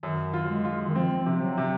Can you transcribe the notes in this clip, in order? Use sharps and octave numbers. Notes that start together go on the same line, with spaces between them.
F#2 D#3
F4
G#3
F4
D#3
F3 C4
F3
C3
F#3
C3